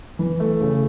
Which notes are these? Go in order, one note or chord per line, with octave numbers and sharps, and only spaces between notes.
E3
A3
C#3